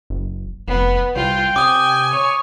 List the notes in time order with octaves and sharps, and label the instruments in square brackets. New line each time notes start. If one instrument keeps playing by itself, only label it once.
[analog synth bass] F#1
[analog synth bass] F1 [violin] B3
[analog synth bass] C2 [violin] F4 [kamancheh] G5
[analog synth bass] C3 [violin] G#5 [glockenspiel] D6 D#6
[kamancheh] C#5